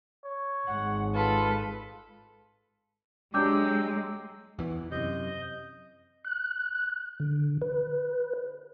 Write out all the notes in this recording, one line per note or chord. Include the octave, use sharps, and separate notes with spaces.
C#5
G#1 G#3 F#5
F4 A4 B4
F#3 G#3 D4 G4 G5 D6 E6 G6
E2 E3
F#2 C3 D#5 G6
F#6
D3
B4